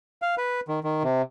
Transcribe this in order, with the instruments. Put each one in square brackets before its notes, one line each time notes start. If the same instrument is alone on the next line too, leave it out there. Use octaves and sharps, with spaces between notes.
[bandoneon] F5
B4
D#3
D#3
C3